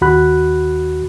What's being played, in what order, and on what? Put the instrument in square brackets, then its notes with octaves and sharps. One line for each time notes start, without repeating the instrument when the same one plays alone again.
[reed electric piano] D#2 F#4 B5 F#6